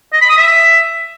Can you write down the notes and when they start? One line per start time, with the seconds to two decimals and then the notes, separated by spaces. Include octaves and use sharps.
0.13 D#5
0.21 B5
0.30 D#6
0.38 E5